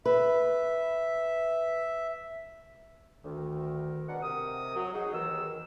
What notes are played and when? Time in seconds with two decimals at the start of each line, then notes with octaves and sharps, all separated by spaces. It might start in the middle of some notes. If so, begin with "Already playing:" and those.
0.05 B4 E5
3.25 D2 D#3
4.09 B2 G#3 D4 A#4 F#5
4.23 C3 A#4 D#6
4.76 F#3
4.94 D#4 F#4 G#4
5.13 D#2 D#3 E3 E6